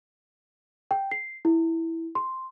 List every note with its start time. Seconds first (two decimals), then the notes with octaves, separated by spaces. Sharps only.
0.91 G5
1.11 C7
1.45 E4
2.15 C6